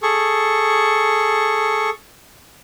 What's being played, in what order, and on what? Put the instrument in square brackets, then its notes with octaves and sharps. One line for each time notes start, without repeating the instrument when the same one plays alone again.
[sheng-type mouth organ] G#4 A4 C#6